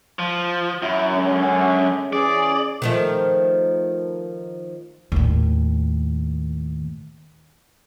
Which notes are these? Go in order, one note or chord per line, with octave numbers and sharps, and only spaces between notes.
F3
F#2 E4
D3 G#3 C#4
E3 C#4 G#4 D5
D#3 F3 A3
D#2 A2